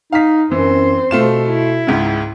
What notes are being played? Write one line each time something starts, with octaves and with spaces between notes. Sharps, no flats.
D#4 F5 B6
F#2 E3 C4 C5
B2 A3 F4 E7
E4
C#2 G#2 C#3